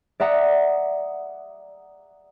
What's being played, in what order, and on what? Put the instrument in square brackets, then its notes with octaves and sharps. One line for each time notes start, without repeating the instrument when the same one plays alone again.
[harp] D5 E5 F#5 A#5 D#6